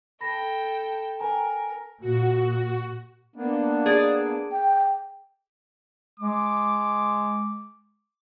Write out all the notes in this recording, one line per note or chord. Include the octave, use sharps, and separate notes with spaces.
A4 G5 B5 A#6
A#4 G5 G#5 A#5
A#2 F#4
A#3 B3 D4
G#4 D5
G5
G#3 D6